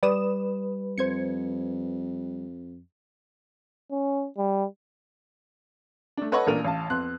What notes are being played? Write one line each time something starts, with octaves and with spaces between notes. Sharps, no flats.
G3 B4 D5 D#6 E7
F2 C5 G#6 C#7
C#4
G3
A3 D4
A4 B4 C#5 D#5 F#5 C#6
A1 A#2 D4 A#4 D#7 F7
A1 F5 A5
F2 B3 C6 F#6